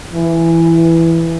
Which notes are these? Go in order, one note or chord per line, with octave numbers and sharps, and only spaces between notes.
E3